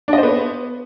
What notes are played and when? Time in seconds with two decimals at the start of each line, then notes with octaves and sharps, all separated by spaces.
0.08 D4
0.13 D#5
0.18 C5
0.23 B3